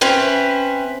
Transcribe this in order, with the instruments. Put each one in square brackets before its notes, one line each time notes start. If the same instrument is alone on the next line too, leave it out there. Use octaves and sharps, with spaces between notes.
[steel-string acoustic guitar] C4 C#4 B4 E5